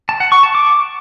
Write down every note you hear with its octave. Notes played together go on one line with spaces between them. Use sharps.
A5
F#5
C#6
A5
D6